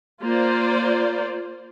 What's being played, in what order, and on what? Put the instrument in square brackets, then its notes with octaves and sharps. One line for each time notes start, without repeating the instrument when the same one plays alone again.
[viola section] A#3 F4 C5 D5